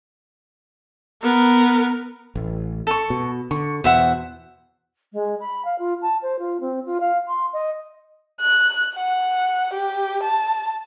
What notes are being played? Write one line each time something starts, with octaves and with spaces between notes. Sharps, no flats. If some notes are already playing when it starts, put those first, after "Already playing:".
B3 A#4
A1
A4 C#6
B2
D3 C#6
E2 B2 C5 E5 F#5
G#3
B5
F5
F4
A5
C5
F4
C4
F4
F5
C6
D#5
F#6
F#5
G4
A5